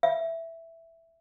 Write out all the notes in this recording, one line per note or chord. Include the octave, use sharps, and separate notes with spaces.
E5